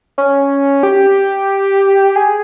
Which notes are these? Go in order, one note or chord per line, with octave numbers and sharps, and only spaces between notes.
C#4
G4
G#4